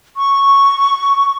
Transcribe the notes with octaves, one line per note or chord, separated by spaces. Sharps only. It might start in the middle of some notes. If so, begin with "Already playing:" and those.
C#6